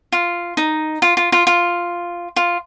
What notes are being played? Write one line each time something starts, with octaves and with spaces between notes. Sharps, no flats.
F4
D#4
F4
F4
F4
F4
F4